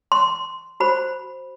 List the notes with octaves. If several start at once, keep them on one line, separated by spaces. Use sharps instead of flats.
C6
F#4 C5 B5